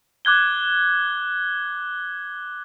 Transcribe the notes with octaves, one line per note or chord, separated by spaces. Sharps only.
D6 F#6 G#6 G7